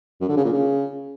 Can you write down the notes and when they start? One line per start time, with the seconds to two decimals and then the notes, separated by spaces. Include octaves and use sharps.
0.21 F#2
0.29 D3
0.37 C#3
0.45 A#2
0.53 C#3